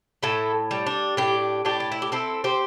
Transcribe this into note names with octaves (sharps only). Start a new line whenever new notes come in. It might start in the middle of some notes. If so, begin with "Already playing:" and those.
A2 E4 A4
G3
D4
A2 D4 G4
A2 D4 G4
D4
E4
G4
C4 E4 A4
G4 C5